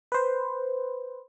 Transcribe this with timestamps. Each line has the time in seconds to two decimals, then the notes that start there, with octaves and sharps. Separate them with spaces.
0.12 B4 C5